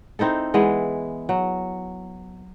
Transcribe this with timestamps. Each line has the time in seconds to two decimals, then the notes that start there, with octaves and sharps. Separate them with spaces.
0.19 C4 D#4 E4 A4
0.54 E3 G#3 B3 E4
1.29 F#3